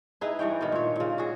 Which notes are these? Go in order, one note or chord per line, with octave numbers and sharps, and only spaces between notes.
D#4 E4 G#4 B4
G2 E3 C#5 G5
B2 D#3
A#2 C#5
A#2 C#3
F#4 G#4